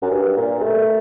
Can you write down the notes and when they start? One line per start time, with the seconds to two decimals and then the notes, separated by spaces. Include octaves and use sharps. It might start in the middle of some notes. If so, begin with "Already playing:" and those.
0.02 F#2
0.11 G2
0.37 A#2
0.62 A3